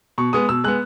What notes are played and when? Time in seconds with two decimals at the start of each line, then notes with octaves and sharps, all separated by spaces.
0.18 B2 C#6
0.33 G#3 B3 D#6
0.49 B2 E6
0.64 G#3 B3 F#6